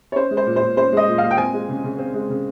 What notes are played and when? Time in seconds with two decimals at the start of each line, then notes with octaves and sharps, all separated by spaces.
0.12 C#5
0.16 C#4 C5
0.31 G#3
0.37 C5
0.46 A#2
0.56 C5
0.62 A#2
0.77 C#4 C5
0.93 G#3 D#5
1.08 A#2
1.18 A#2 F5
1.31 G5
1.37 C4 G#5
1.53 G#3
1.69 C#3
1.84 C#3
1.98 C4
2.14 G#3
2.30 C#3